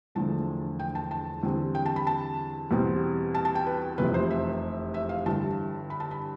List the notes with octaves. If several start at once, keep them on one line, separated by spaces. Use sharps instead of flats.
E1 E2 D3 F3 A3 A5
G5
A5
A5
E2 D3 G3 C4
G5
A5
B5
A5
E2 B2 G3 C4
A5
A5
G5
B4
F1 E2 C3 F3 B4
C5
E5
E5
F5
G1 G2 E3 A5
B5
A5
B5